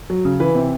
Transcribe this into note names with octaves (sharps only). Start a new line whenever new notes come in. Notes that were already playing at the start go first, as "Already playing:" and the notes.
F#3
C#3
E3 B4
C3